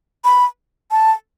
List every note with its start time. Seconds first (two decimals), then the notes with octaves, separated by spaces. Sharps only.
0.24 B5
0.91 A5